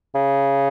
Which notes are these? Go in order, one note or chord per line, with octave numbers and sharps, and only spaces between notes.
C#3